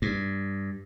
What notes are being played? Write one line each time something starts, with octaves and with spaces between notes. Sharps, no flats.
G2